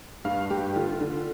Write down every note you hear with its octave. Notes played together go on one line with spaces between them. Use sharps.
G2 F5
G2 G4
D3 F4
D3